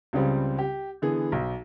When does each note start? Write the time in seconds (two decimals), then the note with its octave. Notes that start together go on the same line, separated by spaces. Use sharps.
0.13 C#2 C#3 G3 C4
0.59 G4
1.02 D3 E3 B3 G#4
1.32 B1